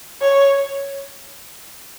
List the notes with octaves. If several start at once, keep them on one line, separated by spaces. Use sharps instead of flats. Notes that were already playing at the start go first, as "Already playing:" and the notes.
C#5